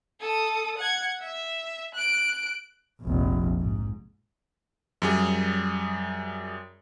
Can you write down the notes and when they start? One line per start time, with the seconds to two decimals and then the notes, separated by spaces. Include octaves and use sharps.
0.21 A4 D#6
0.78 F#5 G#6
1.20 E5
1.95 F#6 D7
3.01 F1 A#1
3.59 G#2
5.02 F#2 G3 G#4